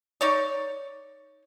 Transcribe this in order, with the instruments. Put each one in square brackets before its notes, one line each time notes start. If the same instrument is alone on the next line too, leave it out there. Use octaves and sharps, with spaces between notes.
[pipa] D#4 C#5 D5